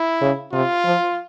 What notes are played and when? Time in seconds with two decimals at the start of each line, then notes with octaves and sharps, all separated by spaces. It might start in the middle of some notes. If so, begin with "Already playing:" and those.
Already playing: E4
0.21 C#3
0.52 C3 F4
0.85 F3